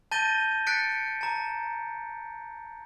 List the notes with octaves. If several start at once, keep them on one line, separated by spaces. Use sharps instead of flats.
A5 G6 A6 A#6 D#7 G7
F#6 A6 B6 C#7 D7
A5 A#5